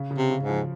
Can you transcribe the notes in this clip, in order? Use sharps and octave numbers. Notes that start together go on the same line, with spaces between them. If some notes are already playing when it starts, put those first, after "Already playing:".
Already playing: C#3
C#3
C3
C#3
G#2
F3